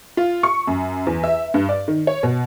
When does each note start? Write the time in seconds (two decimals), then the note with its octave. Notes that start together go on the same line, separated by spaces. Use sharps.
0.17 F4
0.43 C#6
0.67 F#2
1.07 E2
1.24 E5
1.54 G2
1.69 D5
1.88 D#3
2.07 C#5
2.23 B2